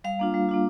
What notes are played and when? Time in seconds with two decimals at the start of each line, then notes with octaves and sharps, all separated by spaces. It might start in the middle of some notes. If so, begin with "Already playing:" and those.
0.04 G3 F5
0.19 A#3 D4 F4
0.34 G3
0.49 A#3 D4 F4